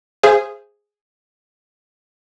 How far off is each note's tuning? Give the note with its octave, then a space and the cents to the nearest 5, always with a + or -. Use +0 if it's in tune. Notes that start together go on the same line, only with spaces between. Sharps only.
G#4 -5 C5 +0 F5 -45